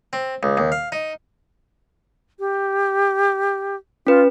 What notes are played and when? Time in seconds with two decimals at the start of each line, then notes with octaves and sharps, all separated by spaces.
0.13 C4
0.43 C#2
0.57 D#2
0.72 F5
0.92 D#4
2.39 G4
4.07 C#4 F4 B4